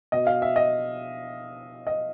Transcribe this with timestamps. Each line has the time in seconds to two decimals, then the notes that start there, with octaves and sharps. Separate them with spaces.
0.12 B2 D#5
0.27 F5
0.42 E5
0.56 D#5
1.87 D#5